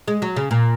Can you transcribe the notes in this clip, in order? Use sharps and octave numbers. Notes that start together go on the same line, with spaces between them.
G#3
F#3
C#3
A#2